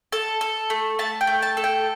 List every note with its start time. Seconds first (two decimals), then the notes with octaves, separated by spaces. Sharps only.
0.12 A4 A5
0.41 A4
0.70 A3
0.99 A3 A5
1.21 G5
1.27 A3
1.42 A5
1.57 A4
1.64 G5